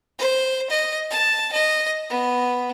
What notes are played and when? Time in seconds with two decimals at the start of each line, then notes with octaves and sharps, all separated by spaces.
0.19 C5
0.70 D#5
1.11 A5
1.53 D#5
2.10 B3